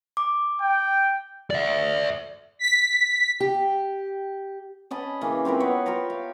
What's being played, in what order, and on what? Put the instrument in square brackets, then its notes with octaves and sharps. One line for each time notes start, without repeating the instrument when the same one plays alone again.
[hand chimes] D6
[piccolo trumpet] G5
[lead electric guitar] D5 E5
[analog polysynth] B6
[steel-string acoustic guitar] G4
[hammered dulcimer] C#4 D#5 A5 B5
C#3 E3 A#3
C4 F4 A#4 B4
B3 C#5
F4 G4 G5 A#5
F5